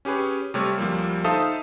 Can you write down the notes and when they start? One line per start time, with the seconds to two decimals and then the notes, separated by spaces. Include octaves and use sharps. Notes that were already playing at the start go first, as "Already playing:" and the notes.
0.05 C#4 G4 G#4 B4 C#5
0.54 C3 G3 A3 C#5 E6 F6
0.77 D2 F3 G3 A#3
1.24 D#4 A4 C5 E5 F5 D#6